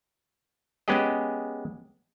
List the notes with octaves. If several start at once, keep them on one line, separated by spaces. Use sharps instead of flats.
G#3 B3 C#4 G4 G#4 D#5